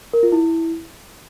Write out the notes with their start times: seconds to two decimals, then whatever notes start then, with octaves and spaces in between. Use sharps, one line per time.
0.13 A#4
0.23 F4
0.32 E4